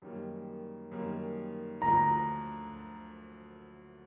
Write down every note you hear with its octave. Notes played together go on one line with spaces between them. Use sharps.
F#2 D#3 G3 A#3
F#2 D#3 G3 A#3
D2 D3 F3 A3 A#5